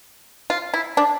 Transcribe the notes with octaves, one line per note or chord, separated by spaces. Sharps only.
F4
E4
D4